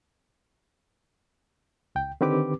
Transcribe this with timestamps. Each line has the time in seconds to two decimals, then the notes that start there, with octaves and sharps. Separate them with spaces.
1.95 C#2 G5
2.21 D3 D#3 C4 G4 B4 D6